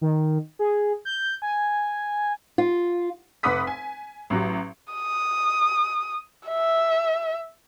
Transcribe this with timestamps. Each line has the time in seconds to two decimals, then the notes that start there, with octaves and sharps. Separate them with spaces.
0.01 D#3
0.59 G#4
1.05 G6
1.42 G#5
2.58 F4
3.43 F1 B4 F#5 D6 D#6 B6
3.67 G#5
4.30 A1 F#3 G4
4.93 D#6
6.48 E5